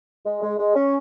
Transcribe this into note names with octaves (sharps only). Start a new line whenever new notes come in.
G#3
G#3
G#3
C#4